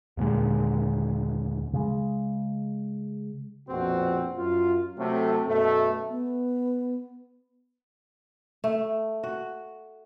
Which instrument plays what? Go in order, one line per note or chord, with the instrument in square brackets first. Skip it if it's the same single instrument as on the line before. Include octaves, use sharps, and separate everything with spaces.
[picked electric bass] D#2 A#2 D3 G#3
C#3 G#3
[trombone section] A#1 F2 B2 C4 F#4
F#2 F4
C3 F#3 A3
F#2 B2 A3
[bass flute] B3
[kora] A3
F#4